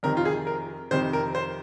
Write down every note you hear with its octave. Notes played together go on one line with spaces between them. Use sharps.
F2 C3 D#3 A#4
F4
G#4
A#4
F2 C3 D#3 C5
A#4
C5